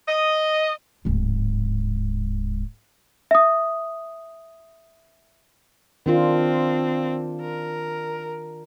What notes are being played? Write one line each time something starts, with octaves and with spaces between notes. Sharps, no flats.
D#5
D1 G#2
E5 D#6
D#3 C4 D4 F4
A#4